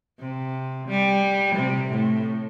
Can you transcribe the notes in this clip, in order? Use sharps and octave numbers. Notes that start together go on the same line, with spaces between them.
C3
G3
C3
A2